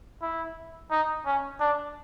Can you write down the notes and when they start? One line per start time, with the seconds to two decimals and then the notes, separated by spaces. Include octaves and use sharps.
0.22 E4
0.91 D#4
1.26 C#4
1.60 D4